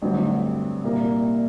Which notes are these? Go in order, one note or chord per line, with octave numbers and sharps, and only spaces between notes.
A1 G2 D3 F#3 C4
C2 A#2 G3 A#3